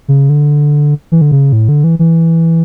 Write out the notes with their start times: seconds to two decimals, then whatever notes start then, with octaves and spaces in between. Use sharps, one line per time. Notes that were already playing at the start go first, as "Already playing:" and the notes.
0.08 C#3
0.29 D3
1.12 E3
1.21 D3
1.31 C#3
1.53 A2
1.69 D3
1.84 E3
1.99 E3